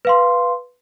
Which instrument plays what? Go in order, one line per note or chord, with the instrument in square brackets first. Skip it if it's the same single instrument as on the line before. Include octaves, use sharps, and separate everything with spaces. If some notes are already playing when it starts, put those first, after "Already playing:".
[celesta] B4 F5 C6